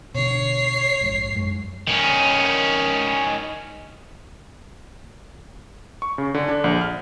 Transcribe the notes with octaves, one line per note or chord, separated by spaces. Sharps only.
B2 D3 C#5 C7
A#1 G#2
F#2 G#3
D#3 C#4
C#6
C#3
D3
D4
A#1
F6